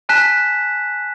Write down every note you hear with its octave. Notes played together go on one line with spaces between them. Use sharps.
G#5 A5 F#6 B6 E7